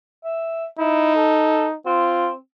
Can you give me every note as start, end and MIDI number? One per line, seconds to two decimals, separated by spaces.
0.24 0.65 76
0.79 1.75 63
0.79 1.12 64
1.16 1.66 69
1.86 2.35 60
1.86 2.31 65